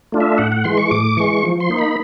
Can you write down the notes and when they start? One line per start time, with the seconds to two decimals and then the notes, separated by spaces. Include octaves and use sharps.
0.12 A3 D4 F4
0.20 E5
0.38 A2 F#5
0.52 F#5
0.64 E3 G#3 C6
0.78 C#6
0.91 A2 D6
1.17 E3 G#3 C#6
1.43 F3
1.60 C6
1.70 A#3 D#4
1.78 B5